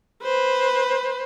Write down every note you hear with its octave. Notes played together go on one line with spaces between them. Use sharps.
B4 C5